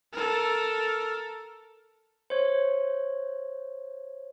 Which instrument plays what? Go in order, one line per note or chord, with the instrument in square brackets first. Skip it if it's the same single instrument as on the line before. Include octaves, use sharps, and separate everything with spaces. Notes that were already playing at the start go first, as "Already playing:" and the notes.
[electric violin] A4 A#4
[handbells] C5 C#5